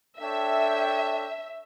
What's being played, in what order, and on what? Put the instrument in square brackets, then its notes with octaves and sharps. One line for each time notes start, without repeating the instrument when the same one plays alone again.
[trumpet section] D4 A4 C#5 G5 [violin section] E5